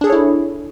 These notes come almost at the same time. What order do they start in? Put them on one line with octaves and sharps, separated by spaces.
D4 G#4 A4 C#5 E4